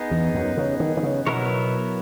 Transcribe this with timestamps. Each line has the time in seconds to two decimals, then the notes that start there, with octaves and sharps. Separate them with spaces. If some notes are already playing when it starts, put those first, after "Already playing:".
Already playing: B3 D#4 G#4
0.11 E2
0.34 F#2
0.57 C#3
0.80 D#3
0.97 D#3
1.03 C#3
1.26 B2 F#3 B3 E4 A#4 C#5